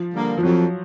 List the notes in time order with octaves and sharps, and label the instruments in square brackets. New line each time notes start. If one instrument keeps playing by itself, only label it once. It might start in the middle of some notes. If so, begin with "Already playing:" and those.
Already playing: [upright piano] F3
[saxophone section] D3 G3 A#3
[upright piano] F3
[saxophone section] F2 [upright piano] F#3